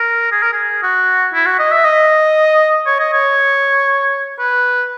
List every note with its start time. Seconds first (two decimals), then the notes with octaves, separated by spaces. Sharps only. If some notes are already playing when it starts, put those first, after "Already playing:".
Already playing: A#4
0.32 G#4
0.43 A#4
0.53 G#4
0.83 F#4
1.34 E4
1.46 F#4
1.59 D#5
1.72 E5
1.85 D#5
2.86 C#5
3.00 D#5
3.13 C#5
4.39 B4